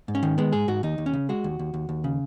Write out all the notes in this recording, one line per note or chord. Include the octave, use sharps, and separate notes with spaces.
G#2
C#4
D#3
G#3 B3
G#2 G#4
G#2 F#4
D#2 D#4
D#2
C#4
C#3
G#3 F#4
D#2
D#2
D#2
D#2
C#3